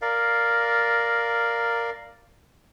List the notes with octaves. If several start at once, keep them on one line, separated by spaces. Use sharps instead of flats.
A#4 D5 F5